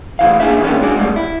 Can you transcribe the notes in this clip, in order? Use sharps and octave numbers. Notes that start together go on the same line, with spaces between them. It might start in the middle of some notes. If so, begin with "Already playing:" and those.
A2 C3 E3 F5
D#2 A#3 D4 E4 G#4 E5
D#3 E3 A#3 B3 C#4 D4
C2 G#2 G#3 D4 F#4 D5
G#2 B2 D3 D#3 G3 A3
E4